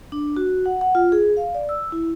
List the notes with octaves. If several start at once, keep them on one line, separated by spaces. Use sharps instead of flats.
D4
F#4
F#5
F#5
F4
G#4
F5
D5
E6
E4